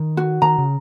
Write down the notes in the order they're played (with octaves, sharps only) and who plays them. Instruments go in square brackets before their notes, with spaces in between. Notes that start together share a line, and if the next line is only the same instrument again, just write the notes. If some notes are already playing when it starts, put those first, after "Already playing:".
Already playing: [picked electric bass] D#3
[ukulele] F#4
[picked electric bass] D#3 [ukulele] A#5
[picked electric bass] C#3